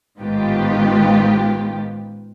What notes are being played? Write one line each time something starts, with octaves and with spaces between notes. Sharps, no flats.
A1 G#2 D#3 B3 F4 G4